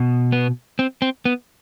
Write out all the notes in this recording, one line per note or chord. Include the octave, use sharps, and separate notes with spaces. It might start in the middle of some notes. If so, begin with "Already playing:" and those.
Already playing: B2
B3
C4
C4
B3